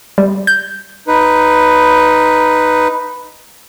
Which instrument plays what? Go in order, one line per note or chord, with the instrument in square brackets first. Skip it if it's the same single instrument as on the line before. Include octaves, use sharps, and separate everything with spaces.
[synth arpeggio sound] G3
G6
[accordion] D#4 B4